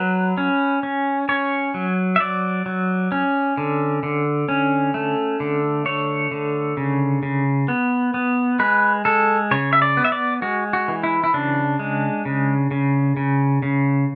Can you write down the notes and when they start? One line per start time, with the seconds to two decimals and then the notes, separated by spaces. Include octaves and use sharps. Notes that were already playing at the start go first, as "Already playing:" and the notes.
Already playing: F#3 B4
0.37 C#4
0.83 C#4
1.29 C#4 C#5
1.74 F#3
2.16 E5
2.20 F#3 D5
2.66 F#3
3.12 C#4
3.57 D3
4.03 D3
4.49 C#4
4.94 A3
5.40 D3
5.86 A3 C#5
6.31 D3
6.77 C#3
7.23 C#3
7.68 B3
8.14 B3
8.59 G#3 B4
9.05 G#3 A4
9.51 C#3 C#5
9.73 E5
9.82 D5
9.97 B3
10.05 E5
10.12 D5
10.42 G#3 F#4
10.73 F#4
10.88 E3
11.03 E4
11.24 E4
11.34 C#3 D4
11.79 G#3
12.25 C#3
12.71 C#3
13.17 C#3
13.63 C#3